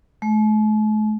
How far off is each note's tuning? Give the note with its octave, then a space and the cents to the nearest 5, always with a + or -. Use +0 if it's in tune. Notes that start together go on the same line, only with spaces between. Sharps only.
A3 -45